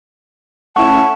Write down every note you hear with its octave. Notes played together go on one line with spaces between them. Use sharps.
A3 C#4 E4 F#5 A5 C#6